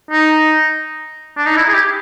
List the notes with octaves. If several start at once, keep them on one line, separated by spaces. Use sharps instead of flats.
D#4
D4
D#4
E4
G#4
G4